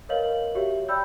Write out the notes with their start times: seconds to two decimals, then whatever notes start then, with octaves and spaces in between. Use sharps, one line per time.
0.09 A#4 B4 C#5 D#5 F5 F#7
0.55 F#4 G4 C#5 E5
0.88 D5 G5 B5 E6 G6